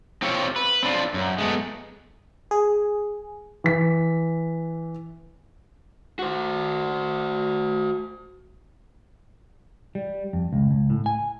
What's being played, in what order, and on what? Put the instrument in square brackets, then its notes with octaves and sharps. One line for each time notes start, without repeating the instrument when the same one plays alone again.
[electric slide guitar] C4 F4 G4 C#5
B4
C4 D4 F4
F#2
G#3 A3 B3
[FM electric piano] G#4
[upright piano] E3 B6
[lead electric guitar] F#4 C5
[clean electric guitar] G3
F2
C#2
C#2
A2
G#5